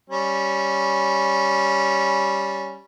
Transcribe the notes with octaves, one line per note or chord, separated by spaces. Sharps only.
G3 C#4